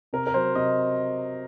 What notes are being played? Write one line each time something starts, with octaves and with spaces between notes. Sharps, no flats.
C3 A#4
A#4
F#3 C5
C3 D#5